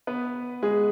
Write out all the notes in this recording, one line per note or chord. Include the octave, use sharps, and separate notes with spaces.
B3 B4
G#3 G#4